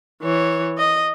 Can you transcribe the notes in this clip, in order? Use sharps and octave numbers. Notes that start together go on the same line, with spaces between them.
E3 C#5
D#5